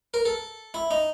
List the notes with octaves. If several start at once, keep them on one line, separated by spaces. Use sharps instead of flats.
A#4
A4
E4
D#4